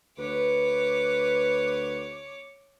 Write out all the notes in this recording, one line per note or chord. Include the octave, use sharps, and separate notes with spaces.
D2 B4 C#5 D6